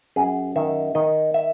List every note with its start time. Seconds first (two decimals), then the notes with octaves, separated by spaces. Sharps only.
0.16 F#2 G#4
0.56 D#3 E5
0.95 D#3 D#5
1.34 E5